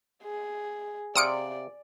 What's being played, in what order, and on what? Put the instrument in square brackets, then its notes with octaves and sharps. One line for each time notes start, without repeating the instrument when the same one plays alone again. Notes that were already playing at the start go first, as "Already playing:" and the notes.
[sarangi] G#4
[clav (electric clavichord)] C3 F5 [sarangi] D5 [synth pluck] D#6 C#7 D7